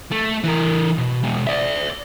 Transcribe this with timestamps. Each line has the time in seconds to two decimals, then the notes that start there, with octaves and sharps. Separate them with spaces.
0.11 A3
0.44 E3 A#4
0.98 B2
1.23 B2 G#3
1.47 D5 E5